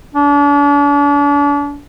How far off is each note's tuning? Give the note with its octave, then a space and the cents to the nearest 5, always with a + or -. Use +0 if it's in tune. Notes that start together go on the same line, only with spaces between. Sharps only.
D4 -40